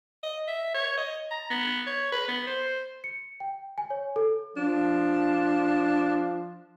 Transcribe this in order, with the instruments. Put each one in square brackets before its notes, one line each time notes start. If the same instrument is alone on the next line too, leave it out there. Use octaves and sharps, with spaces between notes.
[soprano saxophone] D#5
E5
C#5
D#5
A#5
B3
C#5
B4
B3
C5
[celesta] C#7
G5
G#5
C#5
A4
[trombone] F3 [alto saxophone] D4